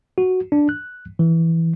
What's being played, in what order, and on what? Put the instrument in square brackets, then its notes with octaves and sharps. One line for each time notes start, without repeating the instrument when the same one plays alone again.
[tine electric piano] F#4
D4
F#6
E3